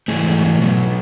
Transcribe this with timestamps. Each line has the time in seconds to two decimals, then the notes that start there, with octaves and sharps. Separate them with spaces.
0.08 G#2 E3 A3 G#4
0.59 B2 F#3 B3